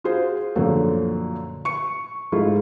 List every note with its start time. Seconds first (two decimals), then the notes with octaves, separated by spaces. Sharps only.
0.04 F4 F#4 G#4 C5
0.56 F#2 A#2 D3 F3 A3
1.65 C#6 C#7
2.32 G#2 G#3 A3 E4 F4